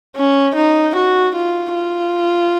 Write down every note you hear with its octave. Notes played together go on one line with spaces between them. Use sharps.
C#4
D#4
F#4
F4
F4